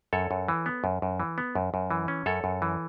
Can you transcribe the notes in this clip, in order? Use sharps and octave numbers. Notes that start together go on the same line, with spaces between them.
F#2 A4 C#5
F#2
E3
B3
F#2
F#2
E3
B3
F#2
F#2
E3
C#4
F#2 A4 C#5
F#2
E3